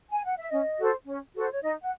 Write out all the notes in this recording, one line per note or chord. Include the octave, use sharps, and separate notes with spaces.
G#5
F#5
E5
C#4 D#5
F#4 A4 C5
C#4
F#4 A4 C5
C#5
D#4 D#5
F#5